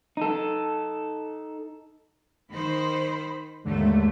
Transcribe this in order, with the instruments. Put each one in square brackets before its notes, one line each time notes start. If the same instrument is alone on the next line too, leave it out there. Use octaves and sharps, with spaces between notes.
[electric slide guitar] D#4 A4
[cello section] D#3 C5 [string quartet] B5
[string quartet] D#2 G#2 [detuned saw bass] D3 [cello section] A3